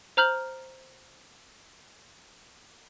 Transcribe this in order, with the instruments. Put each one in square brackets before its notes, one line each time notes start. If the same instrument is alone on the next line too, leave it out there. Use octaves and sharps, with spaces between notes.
[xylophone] C5 A#5 F6 G6 F#7